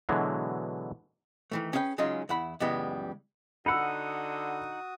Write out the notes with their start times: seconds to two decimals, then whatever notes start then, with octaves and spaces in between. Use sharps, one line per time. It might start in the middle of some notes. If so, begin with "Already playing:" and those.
0.09 B2 D3 E3 F#3 G#3
1.52 D#3 E3 A3
1.73 C#4 G#4 B4 F5 G5
1.98 C#3 F#3 G#3 C#4 D#4 F4
2.29 E2 E4 F#5 B5
2.60 C#2 F#2 E3 G3 G#3 B3
3.66 D3 D#4 F#4 F#5 B5 D#6 E6